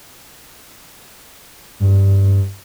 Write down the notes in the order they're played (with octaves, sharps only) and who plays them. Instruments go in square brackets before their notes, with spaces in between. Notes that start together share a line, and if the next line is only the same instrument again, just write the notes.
[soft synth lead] G2